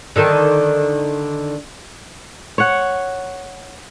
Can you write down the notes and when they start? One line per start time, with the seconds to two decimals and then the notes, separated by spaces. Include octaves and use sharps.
0.16 D3 D#3 A4
2.58 C#5 F#5